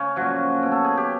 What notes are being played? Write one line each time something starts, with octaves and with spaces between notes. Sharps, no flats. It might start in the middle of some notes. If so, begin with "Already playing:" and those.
Already playing: C#3 C#4
A#2 F3 F#3 F#4
B2 F#3
A4
G#4
G4